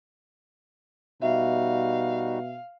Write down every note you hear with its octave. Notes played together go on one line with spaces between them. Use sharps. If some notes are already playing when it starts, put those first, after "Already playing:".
B2 G3 D#4 F#4 E5 F5